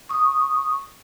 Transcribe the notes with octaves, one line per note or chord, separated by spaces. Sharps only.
C#6 D#6